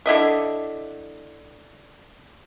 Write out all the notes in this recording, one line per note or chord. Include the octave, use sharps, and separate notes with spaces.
D3 E4 D#5 E5